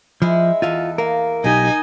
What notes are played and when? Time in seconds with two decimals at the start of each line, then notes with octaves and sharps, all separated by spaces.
0.22 F3 G#3 E4
0.62 E2 F4 A4 F5 G#5
0.98 A#3 A#4
1.44 B1 D#4 G4 D#5 G#5